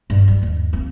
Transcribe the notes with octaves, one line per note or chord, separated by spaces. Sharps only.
G2 A3
G3
D#2
A#3 C4